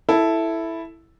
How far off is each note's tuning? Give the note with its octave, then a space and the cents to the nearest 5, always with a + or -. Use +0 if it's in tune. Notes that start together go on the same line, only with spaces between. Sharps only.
E4 +0 A4 +0